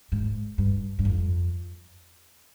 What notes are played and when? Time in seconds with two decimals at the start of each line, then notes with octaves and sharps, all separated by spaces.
0.12 G#2
0.58 G2
0.99 G2
1.05 F2